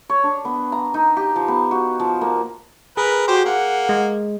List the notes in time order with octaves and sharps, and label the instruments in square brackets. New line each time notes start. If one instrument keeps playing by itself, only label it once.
[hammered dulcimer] C#5
D4
B3
A#5
D#4
G4
F3
B3
F#4
F3
A#3
[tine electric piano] G#4 [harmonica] A#4 B4
[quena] F#4 [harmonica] G4 C5
[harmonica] A#3 [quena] F#5
[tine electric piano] G#3